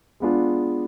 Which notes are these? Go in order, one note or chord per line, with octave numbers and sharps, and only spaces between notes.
G#3 B3 D4 F4 G#4